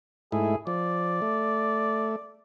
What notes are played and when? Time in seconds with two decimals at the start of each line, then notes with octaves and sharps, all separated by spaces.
0.32 G#2 A3 E4 G#4
0.67 F3 D5
1.22 A3